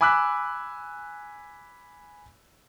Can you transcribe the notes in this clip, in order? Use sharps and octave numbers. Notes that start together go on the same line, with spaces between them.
G#5 B5 D6 E6 F#6 B6